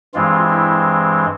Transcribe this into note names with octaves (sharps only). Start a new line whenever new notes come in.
G2 E3 G#3 C4 F4
E4